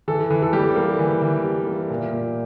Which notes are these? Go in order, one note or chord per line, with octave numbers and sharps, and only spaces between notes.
E3 A4
E3
A4
G3 G4
A#3
E3
E3
G3
A#3
A#2
A#2